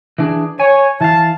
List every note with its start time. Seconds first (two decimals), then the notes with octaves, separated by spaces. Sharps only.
0.18 E3 D4 G#4
0.60 C#5 G#5
1.01 E3 F5 A5